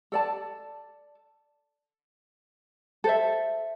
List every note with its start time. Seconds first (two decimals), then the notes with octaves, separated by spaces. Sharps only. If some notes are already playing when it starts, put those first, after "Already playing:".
0.12 A4 D5 A5
3.04 A4 C5 E5